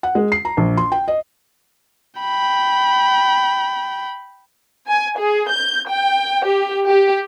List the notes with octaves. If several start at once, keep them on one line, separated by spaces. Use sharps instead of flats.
F#5
G#3
C7
A#5
A#1
C6
G5
D#5
G5 B5
G#5
G#4
G6
G5
G4
G4